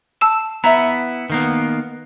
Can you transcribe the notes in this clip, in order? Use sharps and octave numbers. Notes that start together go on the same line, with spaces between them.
A5 E6 E7
B3 E4 E5 A#5
D#3 A#3 B3